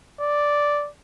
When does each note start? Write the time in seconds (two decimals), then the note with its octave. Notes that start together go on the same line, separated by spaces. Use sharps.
0.21 D5